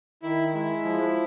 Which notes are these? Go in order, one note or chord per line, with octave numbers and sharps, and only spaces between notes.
D#3 E4
G#3 E4
F3